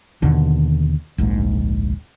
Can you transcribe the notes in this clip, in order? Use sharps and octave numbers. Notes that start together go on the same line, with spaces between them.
D#2 B2 D3
D1 A#1 G#2